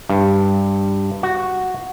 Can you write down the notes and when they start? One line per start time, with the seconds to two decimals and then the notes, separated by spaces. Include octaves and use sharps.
0.09 G2
1.23 F#4